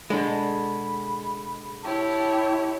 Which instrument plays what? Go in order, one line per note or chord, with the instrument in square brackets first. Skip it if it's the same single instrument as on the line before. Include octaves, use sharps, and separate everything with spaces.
[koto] B2 D3 [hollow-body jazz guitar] G#3 [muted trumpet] B5
[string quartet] E4 G4 C#5 [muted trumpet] A5